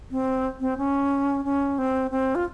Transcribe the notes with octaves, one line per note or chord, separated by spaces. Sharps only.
C4
C4
C#4
C#4
C4
C4
F4